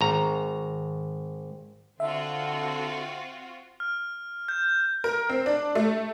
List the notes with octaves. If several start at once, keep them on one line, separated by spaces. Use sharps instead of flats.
G#1 A#5
D3 C4 F4 F#4 E5
F6
G6
A#4
C4
D4
A3